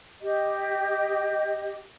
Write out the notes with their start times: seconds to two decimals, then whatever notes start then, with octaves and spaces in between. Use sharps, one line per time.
0.22 G4 D#5